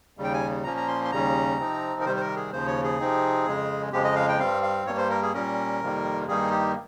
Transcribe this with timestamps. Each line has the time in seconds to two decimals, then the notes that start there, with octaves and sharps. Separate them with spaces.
0.17 D#2 C#3 G3
0.24 G5
0.34 G#5
0.64 A#2 F3 A#3 C#4 A#5
0.77 A#5
0.88 C6
1.05 C6
1.11 D#2 C#3 G3 C#4 A#5
1.58 C3 F3 C4 D#4
2.00 A#4
2.05 C3 D#3 G3 C5
2.17 C5
2.21 A#4
2.36 G#4
2.52 D#2 C#3 F3 C5
2.67 C#5
2.84 G#4
2.99 C3 F3 C4 D#4
3.46 F2 C#3 G#3
3.92 F2 C#3 F3 G#3 G4
4.04 D#5
4.16 F5
4.29 G5
4.40 G2 G3 C4 F5
4.63 F5
4.86 G2 G3 A#3 C#5
4.98 C5
5.10 A#4
5.22 G#4
5.34 A#2 G3 C#4 A#4
5.81 F2 C3 D#3 G3 A#3
6.27 G2 D#3 G3 A#3 D#4 G#4
6.51 G4